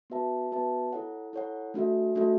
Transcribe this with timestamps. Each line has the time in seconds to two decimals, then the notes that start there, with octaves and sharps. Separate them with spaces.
0.10 B3 F#4 B4 E5 A5
0.52 B3 F#4 B4 E5 A5
0.93 E4 A4 C#5 F#5
1.33 E4 A4 C#5 F#5
1.74 A3 D4 F#4 A4 E5
2.15 A3 D4 F#4 A4 E5